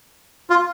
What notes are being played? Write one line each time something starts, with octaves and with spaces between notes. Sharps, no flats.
F4